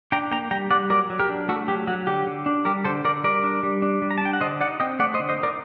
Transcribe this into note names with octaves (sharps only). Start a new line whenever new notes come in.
D4 G5 A#5
A#3 G5 A#5
G3 G5 A#5
G3 D5 F#5
F#3 A#4 D5
F#3
G4 A#4
D4
A3 F#4 A4
F#3 G4
F#3 F#4
D3 G4
D3
D4
G3 G4 A#4
D3 A4 C5
D3 A#4 D5
G3 A#4 D5
D4
G3
D4
G3
A#5
A5
D4 G5
F#5
D3 C5 D#5
D#4 D5 F#5
C4 D#5 G5
A3 D5 F#5
C5 D#5
D3
C5 D#5
D#4 A#4 D5